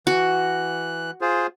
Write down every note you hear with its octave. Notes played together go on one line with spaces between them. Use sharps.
E3 F#4 F#6
F4 G#4 C5